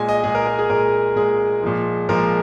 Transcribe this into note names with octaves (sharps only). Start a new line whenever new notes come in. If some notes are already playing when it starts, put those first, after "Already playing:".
Already playing: A#2 G#3 G#5
D#5
A#2 G#3 G#4
A#4
A#4
G#4
A#2 G#3 A#4
A#2 G#3 G#4
A#2 F3 G#3
A#2 F3 G#3 A#4